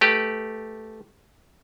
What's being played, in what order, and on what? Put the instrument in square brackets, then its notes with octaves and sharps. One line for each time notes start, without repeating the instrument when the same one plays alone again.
[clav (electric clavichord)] A3 G4 B4